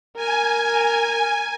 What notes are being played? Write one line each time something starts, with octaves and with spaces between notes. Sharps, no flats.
A#4 G#5